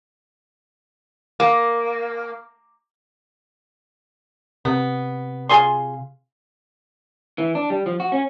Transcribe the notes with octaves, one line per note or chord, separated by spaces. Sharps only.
A#3
C3 B3
F4 G#4 C6
E3
D4
G3
F3
F#4
C#4